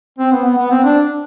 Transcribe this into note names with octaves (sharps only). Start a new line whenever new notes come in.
C4
B3
B3
B3
C4
D4